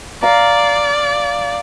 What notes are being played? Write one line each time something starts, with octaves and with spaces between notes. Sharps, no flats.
D5 F5 A#5